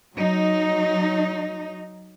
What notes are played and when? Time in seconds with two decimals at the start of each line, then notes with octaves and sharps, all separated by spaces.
0.13 F#3 D#4